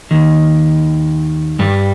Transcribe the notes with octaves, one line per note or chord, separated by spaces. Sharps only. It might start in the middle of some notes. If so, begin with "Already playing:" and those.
D#2 D#3
G2 G3